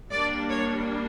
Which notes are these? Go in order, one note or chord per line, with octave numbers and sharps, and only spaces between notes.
G3 A#3 D4 D5
C#5